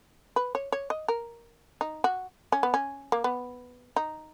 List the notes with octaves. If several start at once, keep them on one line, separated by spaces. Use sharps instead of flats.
B4
C#5
C#5
D#5
A#4
D#4
F#4
C#4
B3
C#4
A#3
B3
D#4